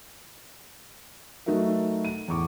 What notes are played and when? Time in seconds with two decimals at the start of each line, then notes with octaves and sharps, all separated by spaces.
1.46 F#3 A3 D#4 F#4 A#4 E5
2.05 D#7
2.28 E2 A2 C#6 D6